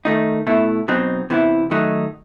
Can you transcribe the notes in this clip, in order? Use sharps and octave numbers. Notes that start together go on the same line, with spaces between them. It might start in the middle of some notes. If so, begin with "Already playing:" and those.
D#3 A3 D#4
B2 A3 E4
B2 F#3 C4 D#4
C3 E3 B3 E4
D#3 F#3 A3 D#4